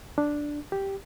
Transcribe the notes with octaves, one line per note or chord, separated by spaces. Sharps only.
D4
G4